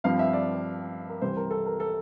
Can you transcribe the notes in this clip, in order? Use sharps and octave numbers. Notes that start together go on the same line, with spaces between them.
G2 F3 C4 F5
E5
D5
A#4
C2 C3 E3 G3 C5
A#4
A4
A#4
A4